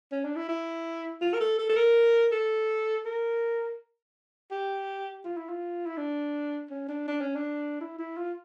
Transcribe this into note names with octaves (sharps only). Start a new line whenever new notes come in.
C#4
D4
E4
E4
F4
A#4
A4
A4
A4
A#4
A4
A#4
G4
F4
E4
F4
E4
D4
C#4
D4
D4
C#4
D4
E4
E4
F4